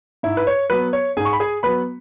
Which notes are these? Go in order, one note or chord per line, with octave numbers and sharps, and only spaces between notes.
G#2 E4 E5
B4
C#5
F#3 B3 B4
C#5
G#2 G#4 G#5
C#6
B5
G#4 G#5
F#3 B3 B4 B5